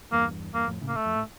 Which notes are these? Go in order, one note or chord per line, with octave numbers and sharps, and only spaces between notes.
E2 G2 A#3
E2 G2 A#3
F2 A2
A2 C#3
A#3
A3
F2
A2